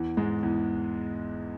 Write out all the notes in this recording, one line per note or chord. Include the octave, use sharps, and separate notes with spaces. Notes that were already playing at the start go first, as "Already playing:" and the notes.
Already playing: E2 E3
G#2 G#3
E2 E3